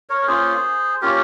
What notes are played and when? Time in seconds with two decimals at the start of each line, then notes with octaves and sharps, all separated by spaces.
0.09 A#4 C#5
0.21 A#4
0.27 A#3 C#4 F4 G#4 C5
1.01 A#3 C#4 F4 G4 A#4